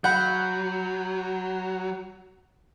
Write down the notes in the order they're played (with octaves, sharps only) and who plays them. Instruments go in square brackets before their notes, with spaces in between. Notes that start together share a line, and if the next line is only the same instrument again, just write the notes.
[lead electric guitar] F#3 [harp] F#5 [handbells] B5 G6